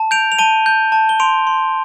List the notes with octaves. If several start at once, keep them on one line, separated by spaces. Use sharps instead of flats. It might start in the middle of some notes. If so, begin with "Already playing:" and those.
Already playing: A5
G6 D7 F7
F7
A5 D#7 G7
G6
A5
G7
C6 D7 F7
C6